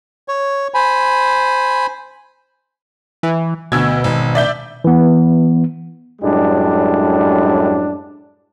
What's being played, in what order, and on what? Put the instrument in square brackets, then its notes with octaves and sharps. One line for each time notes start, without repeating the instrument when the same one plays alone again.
[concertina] C#5
C5 G#5 B5
[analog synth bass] E3
[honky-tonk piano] D2 E6 G#6 [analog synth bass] B2
[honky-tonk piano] G#1
D5 E5 G6
[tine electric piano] E3 B3
[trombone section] F#2 A2 G3 G#3 D4